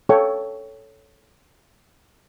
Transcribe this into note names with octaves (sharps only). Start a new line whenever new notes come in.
A4 C#5 F5 G5 C#6